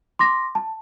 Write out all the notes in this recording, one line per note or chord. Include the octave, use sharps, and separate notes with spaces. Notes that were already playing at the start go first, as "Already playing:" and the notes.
C6 D6 A#6
A5